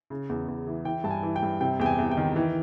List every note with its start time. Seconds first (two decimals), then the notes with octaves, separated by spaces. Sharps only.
0.10 C#3
0.29 E2
0.48 E2
0.67 E3
0.85 E3 G5
1.04 G2 A5
1.11 G#5
1.23 E3
1.36 G5
1.42 G2
1.61 C3 G5
1.79 E2 G5
1.86 G#5
1.98 E2
2.11 G5
2.17 D#3
2.36 E3